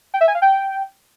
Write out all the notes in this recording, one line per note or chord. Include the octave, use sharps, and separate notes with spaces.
G5
E5
G#5
F5
G5